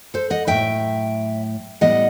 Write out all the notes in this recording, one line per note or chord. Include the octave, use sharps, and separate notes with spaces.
A4 C5
D#5 F#5
A2 F#3 B3 E5 G5
A2 G3 B3 D#5 F#5